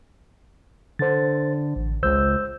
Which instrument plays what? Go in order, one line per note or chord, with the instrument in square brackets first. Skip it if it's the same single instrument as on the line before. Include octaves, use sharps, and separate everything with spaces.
[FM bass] D3 [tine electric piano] C5 A6
[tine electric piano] A1
[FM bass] C#2 [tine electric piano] C5 E6 G6